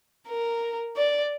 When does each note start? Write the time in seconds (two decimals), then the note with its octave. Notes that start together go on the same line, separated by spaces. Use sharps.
0.28 A#4
0.97 D5